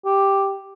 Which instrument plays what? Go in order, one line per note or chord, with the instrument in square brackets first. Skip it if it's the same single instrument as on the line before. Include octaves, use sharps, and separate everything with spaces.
[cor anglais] G4